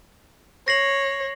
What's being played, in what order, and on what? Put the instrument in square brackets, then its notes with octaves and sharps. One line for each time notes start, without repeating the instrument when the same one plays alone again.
[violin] C#5 [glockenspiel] A#6 C7 F#7